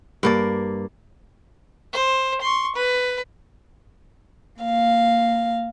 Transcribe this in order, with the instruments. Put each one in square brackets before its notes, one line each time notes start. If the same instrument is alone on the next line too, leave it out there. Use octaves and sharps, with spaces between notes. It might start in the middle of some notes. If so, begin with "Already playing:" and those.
[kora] G2 A#3 D5
[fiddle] C5
C6 C#6
B4
[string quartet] A#3 F5